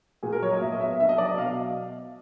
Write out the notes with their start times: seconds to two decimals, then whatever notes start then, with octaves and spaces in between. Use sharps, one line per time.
0.23 A#2 G#4
0.33 A#4
0.42 F#3 C#5
0.52 D#5
0.61 A#2 E5
0.72 D#5
0.80 B3 E5
0.99 D4 E5
1.09 D#5
1.18 F#3 D5
1.29 D#5
1.38 B2 F5